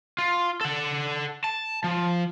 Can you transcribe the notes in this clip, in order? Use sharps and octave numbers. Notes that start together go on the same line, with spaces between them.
F4
A4 F#5
A5
F3